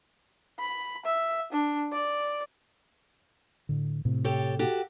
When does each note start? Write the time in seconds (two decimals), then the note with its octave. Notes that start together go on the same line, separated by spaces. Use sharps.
0.59 B5
1.05 E5
1.52 D4
1.92 D5
3.69 A2 D3
4.05 A2 C3
4.24 G4 A4 C#5
4.59 F#4 G4 A4